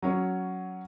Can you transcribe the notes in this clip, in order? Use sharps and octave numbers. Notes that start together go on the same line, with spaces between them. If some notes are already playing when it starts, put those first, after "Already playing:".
F#3 C#4 C#5